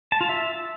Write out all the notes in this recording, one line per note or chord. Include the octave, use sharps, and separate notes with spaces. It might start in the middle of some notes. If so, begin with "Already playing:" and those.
A5
F4
E5